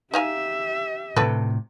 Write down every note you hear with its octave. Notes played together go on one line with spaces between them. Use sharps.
D#4 G4 E5 F5 G#5
A2 C3 D4 A4 B4